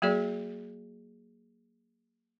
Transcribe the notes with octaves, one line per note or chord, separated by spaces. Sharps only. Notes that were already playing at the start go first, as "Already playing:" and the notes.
F#3 A#3 F#4 G#4 D5